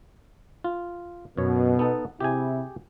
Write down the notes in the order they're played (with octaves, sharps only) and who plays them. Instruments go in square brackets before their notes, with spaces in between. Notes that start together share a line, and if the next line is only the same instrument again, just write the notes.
[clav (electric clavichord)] F4
[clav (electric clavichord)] F#2 C#5 [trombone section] B2
[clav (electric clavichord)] B3 D#4 A4
[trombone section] C3 E4 [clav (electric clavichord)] G4 G#4 G#5